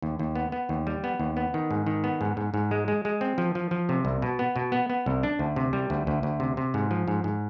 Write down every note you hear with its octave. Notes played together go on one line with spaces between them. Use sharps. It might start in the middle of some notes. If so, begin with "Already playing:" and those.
D#2
D#2
B3
B3
D#2
G3
B3
D#2
B3
D#3
G#2
D#3
B3
G#2
G#2
G#2
G#3
G#3
G#3
C4
F3
F3
F3
C3
C2
B2
B3
B2
B3
B3
C2
D4
D2
C3
G3
D2
D2
D2
C3
C3
G#2
F3
G#2
G#2